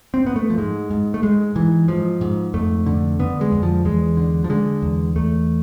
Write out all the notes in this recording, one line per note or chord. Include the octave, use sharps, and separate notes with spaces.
C4
G#2 B3
A3
F3
G#2 G#3
G#2
A3
G#2 G#3
G#2 E3
G#2 F3
G#2
F2 A3
D3
D3 B3
G#3
F2
F3
E2 G#3
D3
F3
D3 G#3
E2
E2 A3